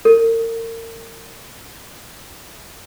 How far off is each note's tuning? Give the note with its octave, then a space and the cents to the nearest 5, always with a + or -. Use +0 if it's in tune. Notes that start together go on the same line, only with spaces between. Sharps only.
A#4 -35